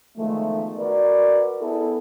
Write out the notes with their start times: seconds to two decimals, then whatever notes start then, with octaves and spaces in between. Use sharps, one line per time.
0.18 E2 D#3 F3 G#3 A3
0.78 F#4 A#4 B4 D5
1.60 B3 E4 G#4 A4